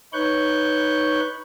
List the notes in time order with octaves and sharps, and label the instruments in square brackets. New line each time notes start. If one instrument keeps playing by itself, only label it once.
[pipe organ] D#4 B4 C#5 C#6 F#6 G6